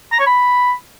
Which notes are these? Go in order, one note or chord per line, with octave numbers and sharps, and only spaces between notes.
A#5
C#5
B5